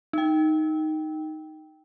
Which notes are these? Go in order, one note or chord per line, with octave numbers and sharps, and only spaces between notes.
D#4 G5